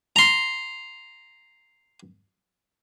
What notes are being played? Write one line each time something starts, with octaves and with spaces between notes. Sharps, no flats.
A#5 C6